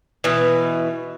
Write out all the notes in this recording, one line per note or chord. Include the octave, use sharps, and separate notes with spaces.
B2 E3